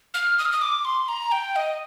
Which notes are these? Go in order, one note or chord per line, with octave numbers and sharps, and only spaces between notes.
F6
D#6
F6
D#6
D6
C6
A#5
G5
D#5